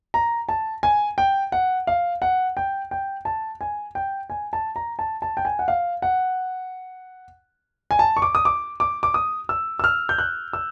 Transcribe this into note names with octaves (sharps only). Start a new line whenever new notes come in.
A#5
A5
G#5
G5
F#5
F5
F#5
G5
G5
A5
G#5
G5
G#5
A5
A#5
A5
A5
G5
G#5
F#5
F5
F#5
G#5
A5
C#6
D6
D#6
D6
D6
D6
D#6
E6
E6
F6
G6
F#6
E6